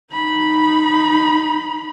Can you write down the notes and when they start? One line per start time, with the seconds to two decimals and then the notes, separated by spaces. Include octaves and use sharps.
0.13 D#4 B5